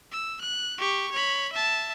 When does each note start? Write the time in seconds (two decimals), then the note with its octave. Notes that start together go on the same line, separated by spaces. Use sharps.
0.12 E6
0.41 F#6
0.78 G4 C#6
1.12 C#5 B5
1.53 E5 A5